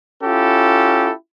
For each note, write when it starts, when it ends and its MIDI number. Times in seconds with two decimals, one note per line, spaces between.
0.24 1.11 61
0.24 1.11 64
0.24 1.11 65
0.24 1.11 67
0.24 1.11 69